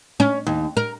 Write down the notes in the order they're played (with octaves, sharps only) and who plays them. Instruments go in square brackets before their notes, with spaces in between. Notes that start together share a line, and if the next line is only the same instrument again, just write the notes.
[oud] C#4
D#2
A#4